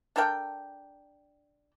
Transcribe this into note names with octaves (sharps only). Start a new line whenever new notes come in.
D4 A4 A#4 G5